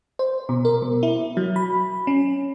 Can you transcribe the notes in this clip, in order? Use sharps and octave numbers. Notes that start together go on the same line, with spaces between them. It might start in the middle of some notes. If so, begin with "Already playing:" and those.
C5
B2
A#4
B2
E4
F#3
B5
C#4